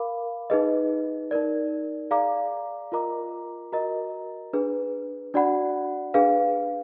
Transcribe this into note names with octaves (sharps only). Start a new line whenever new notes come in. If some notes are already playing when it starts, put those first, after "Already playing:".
Already playing: A#4 F5 B5 D6
D#4 G#4 B4 D#5
D#4 A#4 D5
G#4 D5 F5 A#5 D6
F4 A#4 D#5 A#5 D6
F#4 A#4 D#5 A#5
D4 G#4 B4
D4 F#4 D5 F#5 B5
D4 G#4 B4 F5